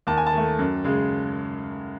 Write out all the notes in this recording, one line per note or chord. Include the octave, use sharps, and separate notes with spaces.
D#2 A5
G#5
A5
D#3 A3
F#2
C#3 G#3